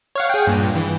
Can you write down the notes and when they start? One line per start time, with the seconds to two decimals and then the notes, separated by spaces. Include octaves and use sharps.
0.15 C#5 F5 F#5
0.29 G#4 G5
0.47 G2 A#2
0.75 E3